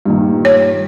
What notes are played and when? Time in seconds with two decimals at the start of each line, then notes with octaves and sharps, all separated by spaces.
0.05 G2 A#2 D#3
0.45 C#5